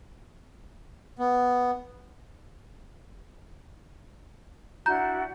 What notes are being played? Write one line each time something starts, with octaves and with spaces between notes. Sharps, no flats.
B3
D4 E4 F#4 A#5 G6